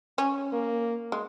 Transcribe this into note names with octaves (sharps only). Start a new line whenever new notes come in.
C#4
A#3
G#3